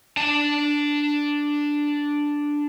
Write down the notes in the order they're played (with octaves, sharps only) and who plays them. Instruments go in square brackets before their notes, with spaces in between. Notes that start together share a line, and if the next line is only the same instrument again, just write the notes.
[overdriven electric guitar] D4 A5